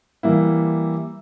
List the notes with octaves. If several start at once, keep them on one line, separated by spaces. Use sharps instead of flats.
E3 G3 A#3 E4